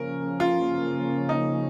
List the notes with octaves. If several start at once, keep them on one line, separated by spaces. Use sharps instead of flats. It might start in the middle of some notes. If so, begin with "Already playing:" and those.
Already playing: C#3 F3 A#3 C#4 A#4
F4
D#4